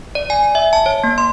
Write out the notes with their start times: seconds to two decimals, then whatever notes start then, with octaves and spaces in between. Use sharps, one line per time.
0.15 D5
0.30 G#5
0.55 E5
0.73 A5
0.86 C#5
1.04 A#3
1.18 C6